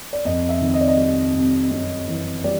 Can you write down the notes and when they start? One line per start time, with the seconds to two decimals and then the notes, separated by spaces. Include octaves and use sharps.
0.13 D5
0.25 F2 D#5
0.49 E5
0.61 D#3
0.74 D#5
0.81 D5
0.88 D#5
0.97 G3
1.35 C3
1.71 F#2
2.08 E3
2.44 G3 D5